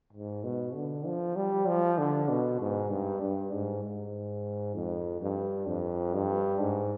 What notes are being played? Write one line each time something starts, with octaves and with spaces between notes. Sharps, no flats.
G#2
B2
D3
F3
G3
F3
D3
B2
G#2
G2
G2
G#2
G#2
F2
G2
F2
G2
G#2